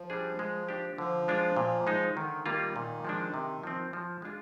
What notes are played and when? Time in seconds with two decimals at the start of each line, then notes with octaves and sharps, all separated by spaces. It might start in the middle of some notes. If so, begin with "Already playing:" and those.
Already playing: F3
0.10 G3 D4 G#4
0.39 G#3
0.69 D4 G4
0.98 D3 F3
1.28 G#3 D4 F4
1.56 A#2
1.87 G#3 D#4
2.16 D3 D#3
2.46 D#3 G3 A#3 F4
2.76 A#2
3.05 F3 G#3 D4
3.34 C3
3.63 F3 C4
3.93 F3
4.22 G#3 D4 F4 G#4